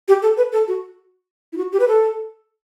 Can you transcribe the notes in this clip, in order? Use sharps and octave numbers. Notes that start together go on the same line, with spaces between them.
G4
A4
B4
A4
F#4
E4
F#4
G4
B4
A4